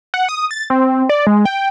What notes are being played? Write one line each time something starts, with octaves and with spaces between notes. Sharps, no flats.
F#5
D#6
A6
C4
D5
G#3
G5